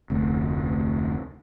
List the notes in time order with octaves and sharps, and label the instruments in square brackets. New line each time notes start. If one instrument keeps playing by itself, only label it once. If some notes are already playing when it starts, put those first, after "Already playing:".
[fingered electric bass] F1 D2